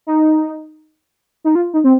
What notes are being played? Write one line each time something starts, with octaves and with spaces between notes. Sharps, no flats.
D#4
D#4
F4
D#4
C4